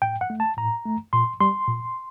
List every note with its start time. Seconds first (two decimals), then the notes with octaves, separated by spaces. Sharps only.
0.02 A2 G5
0.21 F#5
0.30 A3
0.40 A5
0.57 A2 A#5
0.85 A3
1.13 A#2 C6
1.41 G3 C6
1.68 A#2